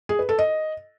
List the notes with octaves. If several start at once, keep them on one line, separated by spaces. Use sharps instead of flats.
G#4
B4
A4
D#5